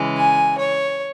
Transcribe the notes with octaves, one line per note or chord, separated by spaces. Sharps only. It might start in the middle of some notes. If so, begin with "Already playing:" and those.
Already playing: C#3 E3 G#3
G#5
C#5